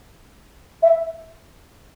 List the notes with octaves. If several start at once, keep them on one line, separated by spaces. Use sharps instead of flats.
E5